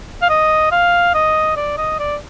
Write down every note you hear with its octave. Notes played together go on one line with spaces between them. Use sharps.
F5
D#5
F5
D#5
D5
D#5
D5